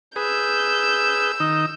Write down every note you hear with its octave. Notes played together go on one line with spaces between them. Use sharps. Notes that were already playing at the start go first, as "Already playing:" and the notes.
G#4 B4 E6 G6
D#3 D#4